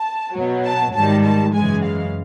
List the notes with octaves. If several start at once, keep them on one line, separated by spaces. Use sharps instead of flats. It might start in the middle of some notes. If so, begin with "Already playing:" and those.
Already playing: A5
B2 F#3
A5
G#2 D#3 G3 A5
A5
F#2 C#3 E3 G#3 G#5
F5